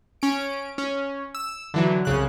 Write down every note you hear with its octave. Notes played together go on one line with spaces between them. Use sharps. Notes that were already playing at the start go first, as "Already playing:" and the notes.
C#4 D7
C#4
E6
D3 E3 F#3
C2 C#3 F#6